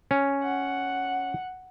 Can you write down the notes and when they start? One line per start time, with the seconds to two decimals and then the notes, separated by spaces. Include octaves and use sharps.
0.11 C#4
0.43 F#5